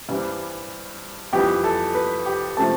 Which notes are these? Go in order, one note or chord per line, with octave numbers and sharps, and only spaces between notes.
G2 E3 G3 C4
F2 E3 G3 G4 G5
A4
B4
G4 G5
C3 F3 A3 C4 A4 A5